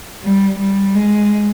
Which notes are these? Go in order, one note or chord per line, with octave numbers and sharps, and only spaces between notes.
G3
G3
G#3